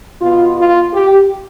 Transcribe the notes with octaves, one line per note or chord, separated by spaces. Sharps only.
B2 B3 F4
F4
G4